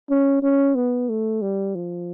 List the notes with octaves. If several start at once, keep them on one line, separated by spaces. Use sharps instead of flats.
C#4
C#4
B3
A3
G3
F3